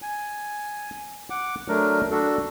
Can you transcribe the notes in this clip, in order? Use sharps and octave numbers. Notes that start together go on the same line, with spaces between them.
G#5
F#5 D6
F#3 A3 D4 A#4
D4 F#4 A4